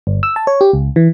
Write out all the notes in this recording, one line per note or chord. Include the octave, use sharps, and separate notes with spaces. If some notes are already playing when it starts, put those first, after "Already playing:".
G1
E6
A5
C#5
G4
C#2
E3